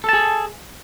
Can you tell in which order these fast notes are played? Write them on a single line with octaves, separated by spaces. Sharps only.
A4 A5 G#4